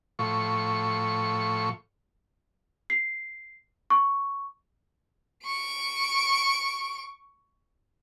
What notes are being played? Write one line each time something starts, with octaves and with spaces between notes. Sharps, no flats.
A2 F3 C#6
C7
C#6
C#6 D7